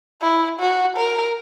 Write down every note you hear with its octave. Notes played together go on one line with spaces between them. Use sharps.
E4
F#4
A#4